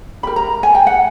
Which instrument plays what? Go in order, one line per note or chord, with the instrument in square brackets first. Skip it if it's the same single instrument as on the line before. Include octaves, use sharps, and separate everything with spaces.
[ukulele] D4 G4 A#4 B5
A#5
G#5
G5
F#5